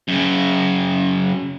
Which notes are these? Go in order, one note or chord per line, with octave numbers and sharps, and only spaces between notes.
F#2 C#3